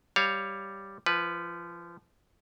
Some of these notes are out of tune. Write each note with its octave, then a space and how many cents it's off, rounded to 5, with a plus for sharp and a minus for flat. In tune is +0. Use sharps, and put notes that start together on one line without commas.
G3 +0 C#5 +5 F5 +0
F3 -25 B4 -5